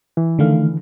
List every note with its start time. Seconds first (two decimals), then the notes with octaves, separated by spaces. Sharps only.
0.17 E3
0.39 D3 D#3 A3 F5